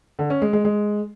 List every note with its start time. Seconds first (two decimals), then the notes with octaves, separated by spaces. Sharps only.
0.19 D3
0.30 C#4
0.42 G#3
0.53 G#3
0.65 G#3